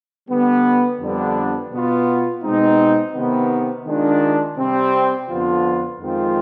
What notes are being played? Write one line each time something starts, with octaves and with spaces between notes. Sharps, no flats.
D3 G3 B3
F2 D3 G3 B3 D4
B2 B3 F4
B2 G#3 C4 D#4
C3 D#3 B3
D#3 G#3 D4 F4
C3 G3 C4
F2 D3 F3 B3 F4
F2 D#3 G#3 C4 F4